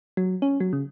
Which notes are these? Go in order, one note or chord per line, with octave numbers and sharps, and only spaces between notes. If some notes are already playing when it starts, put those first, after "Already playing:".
F#3
C#4
F#3
C#3